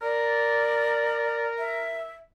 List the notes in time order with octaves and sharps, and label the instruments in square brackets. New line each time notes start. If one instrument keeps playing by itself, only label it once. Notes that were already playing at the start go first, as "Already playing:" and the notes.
[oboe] A#4 [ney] D5
[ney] E5